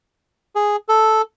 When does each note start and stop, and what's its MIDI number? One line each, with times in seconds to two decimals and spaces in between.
0.55 0.76 68
0.89 1.22 69